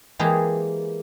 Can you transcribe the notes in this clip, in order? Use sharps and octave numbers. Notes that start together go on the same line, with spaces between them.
E3 G#3 A#3 G4 G#4